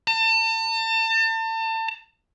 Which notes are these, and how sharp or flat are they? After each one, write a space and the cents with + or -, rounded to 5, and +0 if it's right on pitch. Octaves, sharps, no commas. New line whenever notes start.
A5 +35